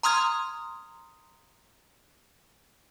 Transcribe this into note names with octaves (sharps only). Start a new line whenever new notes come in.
A#5 C6 D#6 F6 G#6